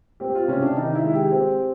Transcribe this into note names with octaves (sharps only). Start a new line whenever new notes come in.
C4 G4
F4
C3 C#4
D4
D#3 D#4
E4
G#3
G4
C4